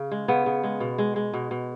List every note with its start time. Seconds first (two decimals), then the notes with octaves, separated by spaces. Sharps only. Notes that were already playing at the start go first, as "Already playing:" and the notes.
Already playing: C#3
0.11 G#3
0.28 C#3 B3
0.46 C#3
0.63 G#3
0.80 B2
0.98 G#3
1.16 G#3
1.33 B2
1.51 B2